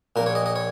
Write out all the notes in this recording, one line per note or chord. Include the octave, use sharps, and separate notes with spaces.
A#1 A#2 A#4
C#5
D#5
D#5
C#5